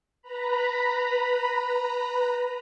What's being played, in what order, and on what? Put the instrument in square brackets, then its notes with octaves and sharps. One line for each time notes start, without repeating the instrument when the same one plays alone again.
[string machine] B4 A#5 B5